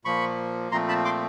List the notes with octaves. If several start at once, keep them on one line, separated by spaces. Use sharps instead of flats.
A#2 F3 A#3 B5 C#6
A#2 F3 A3 C4 A#5 C6
A5 B5
C6 D6